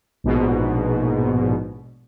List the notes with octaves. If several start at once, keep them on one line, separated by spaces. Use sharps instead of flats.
A#1 G#2 B2